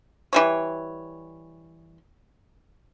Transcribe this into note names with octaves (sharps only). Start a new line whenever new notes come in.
E3 G3 C#5